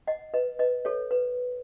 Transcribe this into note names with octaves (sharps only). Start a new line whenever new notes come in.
D#5 F#5
B4 D#5
B4 D#5
A4 C#5
B4